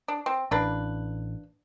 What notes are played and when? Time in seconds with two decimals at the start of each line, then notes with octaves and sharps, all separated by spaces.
0.08 D4
0.26 C4
0.51 A1 A#3 D4 B4